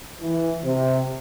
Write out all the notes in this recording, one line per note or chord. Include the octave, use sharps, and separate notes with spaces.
E3
C3